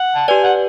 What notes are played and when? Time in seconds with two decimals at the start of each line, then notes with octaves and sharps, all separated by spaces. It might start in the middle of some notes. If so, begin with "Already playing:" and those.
Already playing: F#5
0.15 A5
0.28 G4 B4 D5 G#5
0.44 F#5